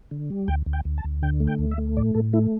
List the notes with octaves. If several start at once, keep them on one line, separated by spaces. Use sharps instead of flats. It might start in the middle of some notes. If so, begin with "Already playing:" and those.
D3
G3
D2 G5
D2
G5
D2
A5
D2
D3 G5
A3
G5
D2
E5
A3
A2 D5
A2 A4
A3 E4